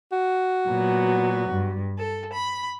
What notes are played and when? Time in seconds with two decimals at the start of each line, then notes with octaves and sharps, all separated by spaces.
0.12 F#4
0.68 A#2 F#3 B3
1.50 G2
1.98 A4
2.33 B5